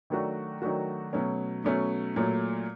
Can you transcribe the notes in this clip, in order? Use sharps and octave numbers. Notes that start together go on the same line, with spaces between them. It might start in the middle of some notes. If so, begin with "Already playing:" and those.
D#3 F#3 A3 D4 F#4
D#3 F#3 A3 D4 F#4
B2 F#3 A3 C#4
B2 F#3 A3 C#4
A#2 F#3 A3